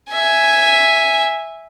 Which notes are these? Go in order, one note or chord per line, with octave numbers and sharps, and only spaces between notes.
E5 G#5